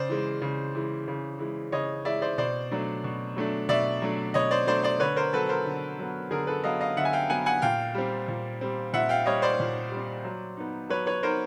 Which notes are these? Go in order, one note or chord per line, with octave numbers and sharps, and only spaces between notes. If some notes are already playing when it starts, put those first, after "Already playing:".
Already playing: C#3 C5 D5
E3 G#3
C#3
E3 G#3
C#3
E3 G#3
C#3 C#5 D#5
E3 G#3 D5 E5
C5 D5
B2 C5 D5
F#3 A3 D4
B2
F#3 A3 D4
B2 D5 E5
F#3 A3 D4
B2 C#5 D#5
C5 D5
F#3 A3 D4 C5 D5
C5 D5
D3 B4 C#5
A#4 C5
F#3 B3 A4 B4
A#4 C5
D3
F#3 B3
D3 G#4 A#4
A4 B4
F#3 B3 D#5 F5
D#5 F5
D3 E5 F#5
G#5
F5 G5
F#3 B3 F#5 G#5
F#5 G#5
A#2 F5 G5
G3 C4
A#2
G3 C4
A#2 E5 F#5
F5 G5
G3 C4 C#5 D#5
C5 D5
A#2
G3
C4
F#3
B3 D#4
F#3 B4 C#5
B4 C#5
B3 D#4 A#4 C5